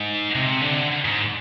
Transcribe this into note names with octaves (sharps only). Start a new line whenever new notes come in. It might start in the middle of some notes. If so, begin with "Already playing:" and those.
Already playing: G#2
C3
D3
G#2